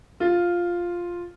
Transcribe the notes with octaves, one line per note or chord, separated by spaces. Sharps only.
F4